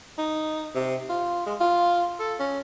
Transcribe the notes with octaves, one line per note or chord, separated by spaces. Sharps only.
D#4
C3
F4
G#3
F4
A4
C#4